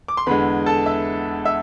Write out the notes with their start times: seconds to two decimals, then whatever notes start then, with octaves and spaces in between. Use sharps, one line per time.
0.08 D6
0.17 C6
0.26 E2 D3 G#3 B4 B5
0.66 A4 A5
0.86 E5 E6
1.45 E5 E6